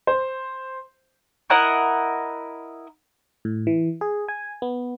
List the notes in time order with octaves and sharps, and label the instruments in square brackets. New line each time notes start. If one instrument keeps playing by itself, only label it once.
[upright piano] C5
[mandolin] E4 A#4 D#5 F#5
[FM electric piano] A2
E3
G#4
G#5
B3